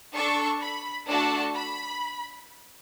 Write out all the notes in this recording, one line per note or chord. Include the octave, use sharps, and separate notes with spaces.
D4 A4 C#6
B5
A3 D4 F#4 A4 A5
B5